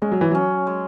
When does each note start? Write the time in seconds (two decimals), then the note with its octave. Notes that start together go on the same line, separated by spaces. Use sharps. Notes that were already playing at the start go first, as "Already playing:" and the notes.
0.02 G#3 C#4
0.12 F#3
0.21 E3
0.31 F#3 C#4
0.67 G#3